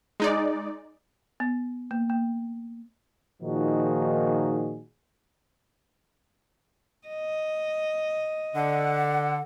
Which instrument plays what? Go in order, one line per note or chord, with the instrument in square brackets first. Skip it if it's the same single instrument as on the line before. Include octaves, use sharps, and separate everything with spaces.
[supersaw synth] G#3 D#4 D5
[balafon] B3
A#3
A#3
[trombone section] A#2 D#3 F3 D#4 F#4 G#4
[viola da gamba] D#5
[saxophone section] D3 [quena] F#5